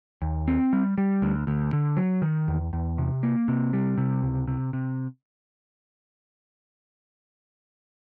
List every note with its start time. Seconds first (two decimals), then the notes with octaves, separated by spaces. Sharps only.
0.22 D#2
0.48 C4
0.73 G3
0.98 G3
1.22 D2
1.47 D2
1.73 D3
1.97 F#3
2.22 D#3
2.48 E2
2.73 E2
2.98 C3
3.23 A#3
3.48 C3
3.73 G3
3.98 C3
4.22 C#2
4.48 C3
4.73 C3